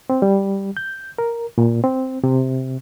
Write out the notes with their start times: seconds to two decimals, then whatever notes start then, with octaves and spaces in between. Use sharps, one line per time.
0.10 C4
0.22 G3
0.77 G6
1.18 A#4
1.58 A#2
1.84 C4
2.24 C3